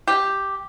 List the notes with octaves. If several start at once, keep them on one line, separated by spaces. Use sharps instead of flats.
G4